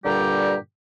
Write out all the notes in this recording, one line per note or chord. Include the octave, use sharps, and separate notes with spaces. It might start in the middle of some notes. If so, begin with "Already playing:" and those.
G2 A#2 D3 G3 G4 A#5